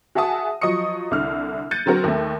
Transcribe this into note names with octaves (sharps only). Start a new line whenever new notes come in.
F#4 G#4 E5 F#5 A5 D#6
F3 F#3 D#5 C#6 D#6 C#7
C2 D3 E4 F6
F#6 G6 A6 C#7 D#7
D3 F#3 C4 F#4 A#4
D#2 A3